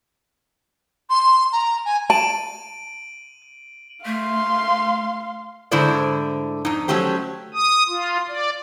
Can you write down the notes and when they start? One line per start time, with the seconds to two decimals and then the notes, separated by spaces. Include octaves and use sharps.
1.10 C6
1.52 A#5
1.85 G#5
2.10 A5 D7 D#7 F#7
4.06 A3 F5 C6
5.71 G#2 D3 A3 E4 C5 D5
6.65 F2 D#4
6.88 F#3 A3 C#4 G4 C5
7.54 D#6
7.89 F4
8.28 D5